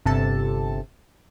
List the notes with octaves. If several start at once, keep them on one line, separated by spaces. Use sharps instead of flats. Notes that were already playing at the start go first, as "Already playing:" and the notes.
G1 C3 A4 A5